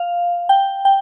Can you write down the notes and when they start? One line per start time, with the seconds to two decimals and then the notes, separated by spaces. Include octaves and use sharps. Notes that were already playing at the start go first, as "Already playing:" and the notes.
Already playing: F5
0.49 G5
0.85 G5